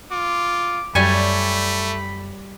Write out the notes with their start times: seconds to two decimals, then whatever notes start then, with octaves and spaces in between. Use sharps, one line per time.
0.11 F4 D6
0.95 F#2 G3 A3 C#5 G#5 B5